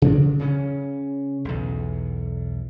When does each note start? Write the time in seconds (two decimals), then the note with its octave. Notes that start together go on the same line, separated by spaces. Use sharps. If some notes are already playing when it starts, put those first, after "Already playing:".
0.02 C#3 F3 F#3 D4
0.39 C#3 C#4
1.45 B1 E2